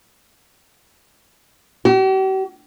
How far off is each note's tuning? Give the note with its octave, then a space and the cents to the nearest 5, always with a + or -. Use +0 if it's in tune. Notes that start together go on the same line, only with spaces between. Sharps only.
G4 -45